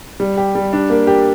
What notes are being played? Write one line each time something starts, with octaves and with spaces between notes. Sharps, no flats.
G3
G4
G3
D4
A#3
G4